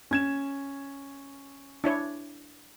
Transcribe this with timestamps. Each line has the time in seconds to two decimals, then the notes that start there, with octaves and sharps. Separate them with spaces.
0.11 C#4 G#6 E7
1.84 D4 E4 C#5